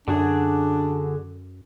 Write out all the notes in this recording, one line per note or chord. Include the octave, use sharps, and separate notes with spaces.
F#2 D3 D4 F#4 G#4